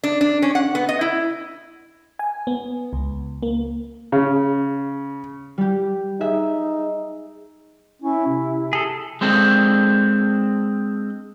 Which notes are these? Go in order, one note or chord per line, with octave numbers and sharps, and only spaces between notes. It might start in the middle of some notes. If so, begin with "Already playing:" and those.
D4
D4
C#4
F#5
B3
D#5
E4
G#5
B3
C#2
A#3
C#3
G3 G4
D#4 G#4 E5
C#4 E4
C3
G#4 A4
G#3 C4 D4 A4